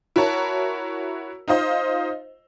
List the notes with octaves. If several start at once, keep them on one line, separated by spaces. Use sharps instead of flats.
E4 F#4 A#4 C#5 A5
D#4 F4 C5 D#5